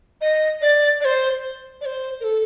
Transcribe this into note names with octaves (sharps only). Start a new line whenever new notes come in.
D#5
D5
D5
C5
D5
C5
A#4
A4